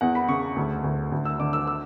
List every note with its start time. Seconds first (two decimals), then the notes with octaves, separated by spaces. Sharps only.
0.01 E2 F#5
0.15 B5
0.28 C#3 C#6
0.56 D2
0.84 D2
1.12 D2
1.25 E6
1.40 D3 D6
1.53 E6
1.67 E6